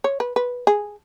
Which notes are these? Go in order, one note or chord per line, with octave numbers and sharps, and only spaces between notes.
C#5
B4
B4
G#4